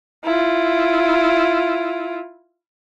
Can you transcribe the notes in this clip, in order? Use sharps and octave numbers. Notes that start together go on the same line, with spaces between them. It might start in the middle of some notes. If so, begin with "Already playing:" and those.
E4 F4